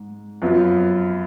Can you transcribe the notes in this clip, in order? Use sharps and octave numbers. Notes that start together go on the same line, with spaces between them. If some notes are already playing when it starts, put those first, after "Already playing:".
Already playing: G#2
F#2 F3 B3